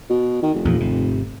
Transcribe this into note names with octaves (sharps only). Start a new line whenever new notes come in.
B2
D#3
F1
E2 A#2 F3
G#1 C3